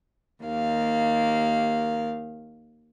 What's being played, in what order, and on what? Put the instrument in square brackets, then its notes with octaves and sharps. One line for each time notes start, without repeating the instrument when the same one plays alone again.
[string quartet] D#2 D#3 A#3 F5